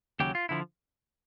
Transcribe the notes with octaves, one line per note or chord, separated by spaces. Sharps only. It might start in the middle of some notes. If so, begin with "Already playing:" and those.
D#2 C#3 F#3 G4
F4
D3 F3 E4